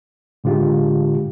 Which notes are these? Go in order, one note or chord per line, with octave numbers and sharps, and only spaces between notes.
A2 D3 G#3 F4 G4